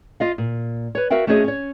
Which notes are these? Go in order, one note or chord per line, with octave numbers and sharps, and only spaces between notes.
F4 D#5 F5
A#2
B4 C#5
F#4 A#4 E5 F5 G5
A3 C#4 F#4 G#4 C#5 D#5
C#4 C#5